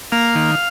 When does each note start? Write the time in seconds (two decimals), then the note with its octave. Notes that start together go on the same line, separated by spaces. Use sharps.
0.12 A#3 F5
0.35 D#3